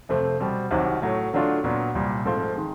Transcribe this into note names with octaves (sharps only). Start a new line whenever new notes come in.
F2 C3 F3 A3 C4
B2 G3 C4
C2 C3 D#3 F#3
A2 F#3 A3
D3 F#3 A3 D4 F4
A#2 F#3 B3 D4
C2 A#2 G3
G#2 F3 A3 C4 F4
D#3 G#3